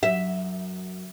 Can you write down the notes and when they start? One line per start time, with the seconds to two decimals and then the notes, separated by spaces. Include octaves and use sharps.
0.03 F#2 E5